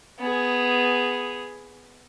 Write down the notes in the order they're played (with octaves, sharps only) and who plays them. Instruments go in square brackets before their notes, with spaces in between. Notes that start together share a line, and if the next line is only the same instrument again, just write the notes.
[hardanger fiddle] B3 G#4